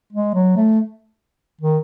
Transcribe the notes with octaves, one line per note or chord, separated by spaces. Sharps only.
G#3
F#3
A3
D#3